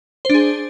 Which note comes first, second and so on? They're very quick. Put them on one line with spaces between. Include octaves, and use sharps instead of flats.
C5 D4 G#4